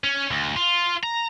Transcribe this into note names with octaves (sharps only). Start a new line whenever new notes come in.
C#4
D2
F4
A#5